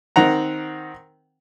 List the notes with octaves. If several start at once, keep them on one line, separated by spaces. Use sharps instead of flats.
D#3 C4 F#5 A#5